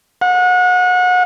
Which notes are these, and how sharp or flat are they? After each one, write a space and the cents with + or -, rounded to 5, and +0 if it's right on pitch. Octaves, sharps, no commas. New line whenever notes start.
F#5 -30